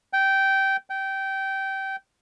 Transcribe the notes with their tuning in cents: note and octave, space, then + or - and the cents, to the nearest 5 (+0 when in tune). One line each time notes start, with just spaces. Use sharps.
G5 -15
G5 -20